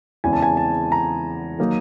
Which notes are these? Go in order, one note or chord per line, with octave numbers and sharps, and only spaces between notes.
E2 C#3 E3 G#3 C4 G#5
A5
G#5
A5
A#5
D#3 F#3 A#3 D#4